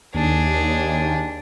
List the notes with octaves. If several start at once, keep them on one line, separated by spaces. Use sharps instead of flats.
D#2 D4 G#4